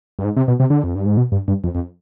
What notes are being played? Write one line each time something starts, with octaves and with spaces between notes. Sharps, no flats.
G2
G#2
C3
B2
C3
D3
F2
G2
G#2
B2
G2
G2
F2
F2